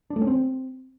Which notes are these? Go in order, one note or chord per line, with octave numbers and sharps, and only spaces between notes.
D4
A3
C#4
C4